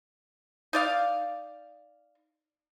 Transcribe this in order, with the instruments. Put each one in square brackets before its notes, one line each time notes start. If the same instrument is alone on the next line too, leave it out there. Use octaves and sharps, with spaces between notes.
[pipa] D#4 D5 F5